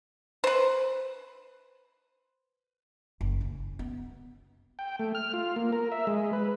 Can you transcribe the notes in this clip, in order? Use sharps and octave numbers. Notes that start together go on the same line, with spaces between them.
B4 C5
F#1
C#3
B3
G5
A3
F6
F4
A#3
A#4
E5
G#3
B4